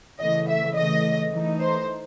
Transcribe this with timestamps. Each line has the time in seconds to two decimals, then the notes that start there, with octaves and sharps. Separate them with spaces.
0.19 C#3 E3 A3 D#5
0.48 E5
0.76 C#3 E3 A3 D#5
1.31 E3 A3 D#4
1.60 C5